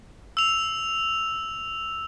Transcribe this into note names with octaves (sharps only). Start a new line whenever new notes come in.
E6 F7